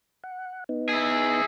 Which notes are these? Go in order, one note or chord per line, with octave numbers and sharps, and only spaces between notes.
F#5
B3 D#4
E4 G#4